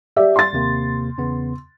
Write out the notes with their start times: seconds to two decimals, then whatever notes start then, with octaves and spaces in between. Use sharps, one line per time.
0.16 G4 D5 E5
0.36 C6 A6
0.53 D#2 C3 A#3
1.18 E2 C#3 B3